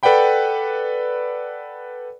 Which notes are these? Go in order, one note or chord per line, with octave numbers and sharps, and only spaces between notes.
A4 B4 D5 F#5 G5 B5